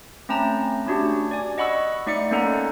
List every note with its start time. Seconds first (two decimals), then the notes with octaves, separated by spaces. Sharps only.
0.29 A3 C4 C#4 A5 A#5
0.86 A3 C#4 D4 F#4 G4
1.31 D5 G#5
1.58 D#5 F#5 B5 C#6 E6
2.06 A3 D#4 D5 E5 C#7
2.31 A#3 C#4 D#4 A4 F#5 A#5